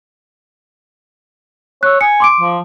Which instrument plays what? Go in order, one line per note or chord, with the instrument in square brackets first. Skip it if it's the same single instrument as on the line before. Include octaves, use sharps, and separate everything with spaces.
[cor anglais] C#5 [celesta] E6 F#6
[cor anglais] G#5 [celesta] C#7
[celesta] C6 D6 D7
[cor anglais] F3